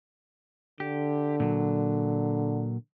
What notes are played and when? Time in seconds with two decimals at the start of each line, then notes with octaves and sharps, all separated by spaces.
0.80 D3 G4
1.40 A#2 F#3